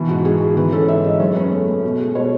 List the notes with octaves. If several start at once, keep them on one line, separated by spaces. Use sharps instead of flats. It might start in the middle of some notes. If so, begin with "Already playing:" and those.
Already playing: B2 E3
G#2 F#4
G#3 G#4
G#2
E3 B4
C#4 A4
G#2 E5
G#3 D#5
F#2 C#5
C#4 B4
A3
A3
B2
G#3
B2 C#5